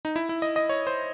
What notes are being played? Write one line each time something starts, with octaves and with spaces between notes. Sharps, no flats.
D#4
E4
E4
D#5
D#5
C#5
C5